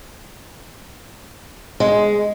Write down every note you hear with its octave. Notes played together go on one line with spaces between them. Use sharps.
G#3